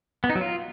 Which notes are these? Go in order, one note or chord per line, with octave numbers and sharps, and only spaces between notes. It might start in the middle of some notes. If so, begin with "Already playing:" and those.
B3
D#4
F#3
F4